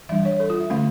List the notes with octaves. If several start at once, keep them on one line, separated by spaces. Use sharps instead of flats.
E3 G3 D4 E5
C#5
A4
F4
E5
D3 A3 C#4 F5